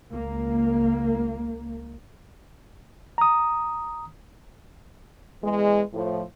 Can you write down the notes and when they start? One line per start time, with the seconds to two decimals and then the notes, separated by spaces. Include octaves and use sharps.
0.11 C#2 A#3
3.18 A#5 D#6
5.43 E2 E3 G#3
5.93 A2 F3